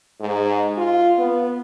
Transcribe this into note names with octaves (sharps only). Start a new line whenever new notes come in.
G#2
F4
B3